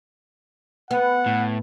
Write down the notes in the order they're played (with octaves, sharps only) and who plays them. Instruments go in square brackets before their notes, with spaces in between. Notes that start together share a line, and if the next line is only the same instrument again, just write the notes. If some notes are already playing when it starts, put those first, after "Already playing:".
[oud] B3 [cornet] F#5
[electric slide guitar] A2